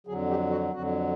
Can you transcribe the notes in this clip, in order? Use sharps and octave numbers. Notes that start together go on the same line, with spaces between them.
F2 D3 F#3 G#4
G4
F#4
F2 D3 F#3 F#4